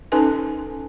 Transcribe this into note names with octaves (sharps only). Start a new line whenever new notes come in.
C#4 D#4 A4 B4 G#5